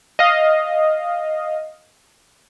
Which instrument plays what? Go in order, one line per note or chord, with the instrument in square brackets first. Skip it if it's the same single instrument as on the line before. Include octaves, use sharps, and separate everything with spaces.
[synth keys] D#5 F5